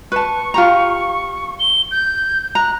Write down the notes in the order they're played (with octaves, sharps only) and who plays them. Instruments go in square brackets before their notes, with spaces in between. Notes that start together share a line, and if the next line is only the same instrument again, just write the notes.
[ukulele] B4 A5 [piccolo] C#6
[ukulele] F4 G4 A#5
[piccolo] G7
G6
[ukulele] A#5 [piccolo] F#6